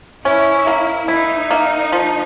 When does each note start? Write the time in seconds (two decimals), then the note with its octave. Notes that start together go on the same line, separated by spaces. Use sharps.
0.25 C#4 E4
0.67 A#3
1.08 D#4 E4
1.51 A#3
1.92 F3